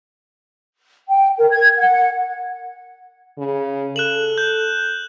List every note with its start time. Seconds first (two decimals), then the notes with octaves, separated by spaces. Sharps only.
1.09 G5
1.37 A#4
1.50 G#6
1.77 F#5
3.38 C#3
3.96 A4 F#6 E7 F#7
4.38 G6